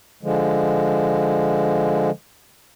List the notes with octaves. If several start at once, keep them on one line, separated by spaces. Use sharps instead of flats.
D3 F3 G#3